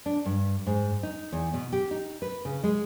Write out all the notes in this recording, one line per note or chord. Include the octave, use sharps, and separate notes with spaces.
D4
G2
G#2
D#4
E2
B2
G4
D#4
B4
C#3
G#3